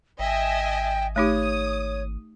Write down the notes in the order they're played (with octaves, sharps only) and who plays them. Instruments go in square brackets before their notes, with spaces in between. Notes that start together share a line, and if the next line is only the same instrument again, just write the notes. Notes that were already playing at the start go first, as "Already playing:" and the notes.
[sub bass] G#1 [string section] D#5 E5 G#5 [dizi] G5
[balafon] A3 D#4 G4 [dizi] C#5 [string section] D#6